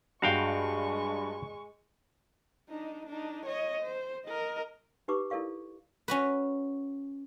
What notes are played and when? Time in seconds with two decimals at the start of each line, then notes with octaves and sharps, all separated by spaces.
0.22 G2 G#3 F#4 F5 G5 C#6
2.69 D4 D#4
3.07 D4 D#4
3.46 C#5 D#5
3.83 C5
4.25 A#4 D#5
5.08 D#4 G4 B4 C#6 D6
5.30 E4 A4 A#4 D5 F5 C#6
6.08 C#4 F#4 B4